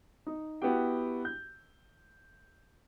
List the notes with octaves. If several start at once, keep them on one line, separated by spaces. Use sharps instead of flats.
D#4
B3 E4 F#4 G4 G5
G6